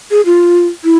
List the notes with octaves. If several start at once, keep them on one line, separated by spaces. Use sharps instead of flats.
G#4
F4
E4